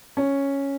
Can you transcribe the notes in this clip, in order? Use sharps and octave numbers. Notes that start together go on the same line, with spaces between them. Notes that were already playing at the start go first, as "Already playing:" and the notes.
C#4